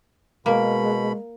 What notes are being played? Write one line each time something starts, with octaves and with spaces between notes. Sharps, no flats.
B2 G#3 A#3 B5